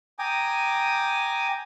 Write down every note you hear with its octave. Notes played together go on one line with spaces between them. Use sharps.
G5 G#5 A#5 D6 D#6